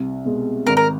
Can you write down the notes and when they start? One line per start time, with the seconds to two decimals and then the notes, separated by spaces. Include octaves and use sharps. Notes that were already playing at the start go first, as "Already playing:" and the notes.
Already playing: C2
0.25 B2 G#3
0.66 G#1 A#4
0.77 A#4